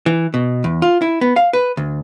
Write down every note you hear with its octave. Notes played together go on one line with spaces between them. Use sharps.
E3
B2
E2
F4
E4
B3
F5
B4
D2